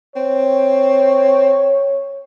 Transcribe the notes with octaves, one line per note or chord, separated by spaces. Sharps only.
C4 C#5